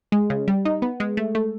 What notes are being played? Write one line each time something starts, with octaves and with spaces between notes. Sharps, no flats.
G#3
C#3
G3
D#4
B3
G#3
A3
A3